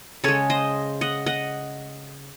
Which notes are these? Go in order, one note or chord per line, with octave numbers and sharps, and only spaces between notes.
C#3 G#3 A4 C#5
C5 D#5
D#5 F#5
D#5 F#5